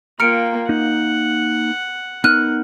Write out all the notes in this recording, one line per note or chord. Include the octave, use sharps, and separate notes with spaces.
A#3 F4 G5 A#5 F6 C#7 D7
A#3 D#4 F#5
B3 D#4 A#4 F6 F#6 D#7